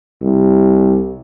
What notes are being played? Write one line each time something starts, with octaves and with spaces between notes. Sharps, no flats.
C2